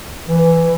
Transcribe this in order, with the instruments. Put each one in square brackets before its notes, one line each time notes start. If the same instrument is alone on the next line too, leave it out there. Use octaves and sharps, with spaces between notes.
[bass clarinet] E3